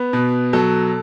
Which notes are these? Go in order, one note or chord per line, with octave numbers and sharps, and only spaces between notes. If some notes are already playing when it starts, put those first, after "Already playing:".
Already playing: B3
B2
F#3 A4